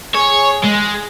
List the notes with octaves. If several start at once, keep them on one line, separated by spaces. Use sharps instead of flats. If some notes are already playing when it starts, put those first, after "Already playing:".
G#4 C#5
G#3